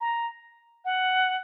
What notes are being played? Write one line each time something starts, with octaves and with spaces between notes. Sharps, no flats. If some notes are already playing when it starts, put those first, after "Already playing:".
A#5
F#5